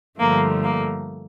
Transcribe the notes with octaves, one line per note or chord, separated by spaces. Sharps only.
G2 D3 F3 A3 A#3
A#3